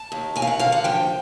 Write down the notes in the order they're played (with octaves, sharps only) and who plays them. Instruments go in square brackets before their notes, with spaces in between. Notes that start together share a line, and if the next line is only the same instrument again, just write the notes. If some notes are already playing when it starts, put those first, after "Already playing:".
Already playing: [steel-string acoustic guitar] A5
D#2
D#2 G#5
F5
F#5
D3 F5
F#5
F3 G5